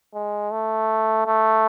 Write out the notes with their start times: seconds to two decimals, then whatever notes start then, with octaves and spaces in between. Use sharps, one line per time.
0.14 G#3
0.51 A3
1.26 A3